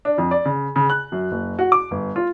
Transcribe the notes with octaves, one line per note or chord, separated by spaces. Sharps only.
D4
F2
D5
C#3
C#3
F#6
F#2
F#1
F#4
D6
G1
F4